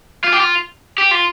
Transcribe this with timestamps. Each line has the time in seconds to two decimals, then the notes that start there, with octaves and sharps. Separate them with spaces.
0.24 F4
0.32 G4
0.40 F4
0.98 G4
1.11 F4